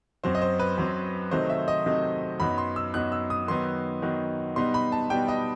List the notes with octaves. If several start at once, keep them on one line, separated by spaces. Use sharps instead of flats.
F#2 F#3 C4 C5
D#5
C5
B4
F#2 F#3 C4
C3 D#3 F#3 A3 D#4 C5
E5
D#5
C3 D#3 F#3 A3 D#4
F#2 F#3 B3 D#4 B5
C6
E6
F#2 F#3 B3 D#4 F#6
E6
D#6
D#3 F#3 B3 D#4 C6
D#3 F#3 B3 D#4
B2 G3 B3 D#4 C6
B5
A5
B2 G3 B3 D#4 G5
D#5